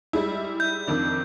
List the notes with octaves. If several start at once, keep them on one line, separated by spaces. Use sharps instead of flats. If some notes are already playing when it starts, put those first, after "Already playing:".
G3 G#3 E4
G6
F2 D#3 D4